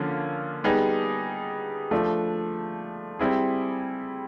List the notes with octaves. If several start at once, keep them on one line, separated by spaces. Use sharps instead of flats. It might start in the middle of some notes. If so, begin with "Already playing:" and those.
Already playing: D3 F3 A#3 C#4 F4
G3 B3 D#4 G#4
F3 A3 D4
G3 C4 E4 G#4